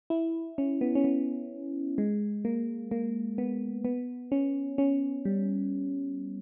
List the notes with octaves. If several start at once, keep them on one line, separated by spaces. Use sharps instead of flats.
E4
C#4
B3
C#4
B3
G#3
A#3
A#3
B3
B3
C#4
C#4
G3